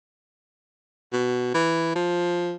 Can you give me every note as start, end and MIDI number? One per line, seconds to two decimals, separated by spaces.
1.12 1.51 47
1.54 1.91 52
1.96 2.55 53